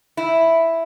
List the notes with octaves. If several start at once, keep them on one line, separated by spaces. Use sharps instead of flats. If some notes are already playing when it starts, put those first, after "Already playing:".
E4